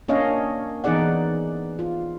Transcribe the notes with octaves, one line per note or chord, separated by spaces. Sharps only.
A#3 C#4 D4 C#5 D#5 F5
E3 B3 D#4 G#4 D5 F#5
F4